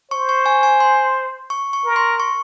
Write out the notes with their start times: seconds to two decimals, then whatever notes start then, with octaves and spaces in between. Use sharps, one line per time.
0.11 C5 C#6
0.29 C#6
0.46 G#5
0.63 G#5
0.80 C6
1.50 C#6
1.73 C#6
1.85 A#4
1.96 C6
2.20 C#6